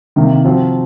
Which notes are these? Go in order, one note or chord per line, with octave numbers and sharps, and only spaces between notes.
C3 D#3 A#3
F3 C4 F#4